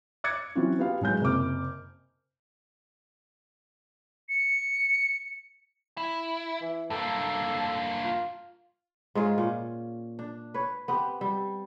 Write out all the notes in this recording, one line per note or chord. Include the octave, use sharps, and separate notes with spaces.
D6 F#6 G#6 A6 C#7
E3 F#3 C4 C#4 F4 F#4
B3 F4 G4 F5
A1 F#3 G#3 G6
F#1 C3 D6 F6
C#7
E4
E3
G2 A#3 A4
F4
G#2 G#3 F4 C#5
A#2 C#4
D4
B4 C#5
B3 C4 G4
G3